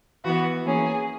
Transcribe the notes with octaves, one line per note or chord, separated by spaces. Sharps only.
E3 B3 F#4
E3 A#3 C#4 G#4